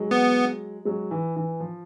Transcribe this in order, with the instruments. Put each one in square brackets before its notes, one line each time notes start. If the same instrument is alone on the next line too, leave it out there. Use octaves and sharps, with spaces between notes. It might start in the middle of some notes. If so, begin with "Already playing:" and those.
Already playing: [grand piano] F#3 G#3
[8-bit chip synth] B3
[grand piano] F#3 G#3
E3
E3
F3